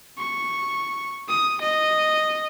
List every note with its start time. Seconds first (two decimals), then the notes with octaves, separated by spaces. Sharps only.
0.18 C#6
1.29 D#6
1.62 D#5